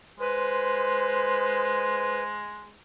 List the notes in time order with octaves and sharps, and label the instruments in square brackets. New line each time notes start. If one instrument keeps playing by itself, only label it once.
[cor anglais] G#3 [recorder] B4 [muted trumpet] C5